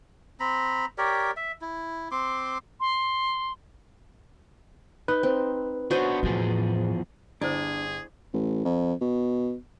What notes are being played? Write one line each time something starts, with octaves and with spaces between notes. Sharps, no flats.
C4 A#5 B5
G4 A#4 C#5 D5
E5
E4
C4 C6 D6
C6
D#4 B4
C4
B3 D4 F#4 C5 C#5 D#5
E2 A2 F3 G#4
G1 D4 E4 G#4 C5
A1
F2
B2